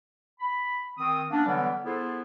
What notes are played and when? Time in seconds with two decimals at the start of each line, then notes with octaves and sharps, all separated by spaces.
0.40 B5
0.98 D#3 C4 D#6
1.30 A#3 B3 C#4 D4
1.46 D3 E3 F#3 G3 B3
1.85 B3 E4 F4 G#4 A4 C5